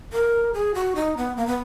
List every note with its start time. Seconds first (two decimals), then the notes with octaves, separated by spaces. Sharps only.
0.13 A#4
0.54 G#4
0.75 F#4
0.96 D#4
1.17 B3
1.37 A#3
1.47 B3